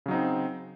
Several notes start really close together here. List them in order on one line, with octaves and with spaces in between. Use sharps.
C#3 F#3 D#4 C4